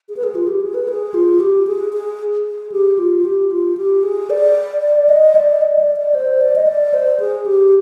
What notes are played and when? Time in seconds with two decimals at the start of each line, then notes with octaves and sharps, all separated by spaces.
0.09 G#4
0.17 B4
0.24 G#4
0.35 F4
0.48 G4
0.61 G#4
0.74 B4
0.88 G#4
1.14 F4
1.40 G4
1.67 G#4
1.93 G#4
2.45 G#4
2.72 G4
2.99 F4
3.25 G4
3.51 F4
3.77 G4
4.03 G#4
4.30 D5
5.09 D#5
5.35 D5
5.61 D#5
5.79 D5
5.97 D5
6.15 C5
6.41 D5
6.56 D#5
6.67 D5
6.94 C5
7.20 G#4
7.46 G4